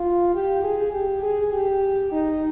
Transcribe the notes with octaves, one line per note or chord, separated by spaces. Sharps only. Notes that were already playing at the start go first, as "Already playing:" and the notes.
Already playing: F4
G4
G#4
G4
G#4
G4
D#4